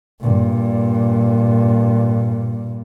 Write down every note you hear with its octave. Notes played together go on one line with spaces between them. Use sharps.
G2 A#2